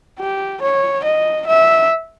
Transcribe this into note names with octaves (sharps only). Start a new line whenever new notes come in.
G4
C#5
D#5
E5